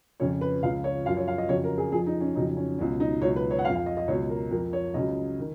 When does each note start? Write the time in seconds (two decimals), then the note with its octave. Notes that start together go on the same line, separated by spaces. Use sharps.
0.20 F2 C#3 F3 C#5
0.41 B4
0.63 C#2 C#3 F3 F5
0.84 C#5
1.05 F#2 F5
1.09 F3
1.17 C#5
1.28 F5
1.38 D#5
1.49 F2 C#3 F#3 C#5
1.64 A#4
1.78 G#4
1.92 F2 F3 G#4
2.06 D#4
2.21 C#4
2.35 F2 C#3 F#3 D#4
2.57 C#4
2.79 C#2 B2 F#3 C#4
3.00 D#4
3.22 C#2 B2 F#3 C#5
3.36 B4
3.51 C#5
3.59 F#5
3.65 F3 F5
3.69 F2
3.75 F5
3.86 D#5
3.97 D#5
4.08 C#2 B2 F#3 C#5
4.30 A#4
4.51 F2 F3 A#4
4.73 C#5
4.94 C#2 C#3 F#3 D#5
5.40 D#3